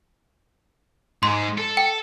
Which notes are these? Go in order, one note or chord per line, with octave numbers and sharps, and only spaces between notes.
G#2 G#3 C6
A4
G5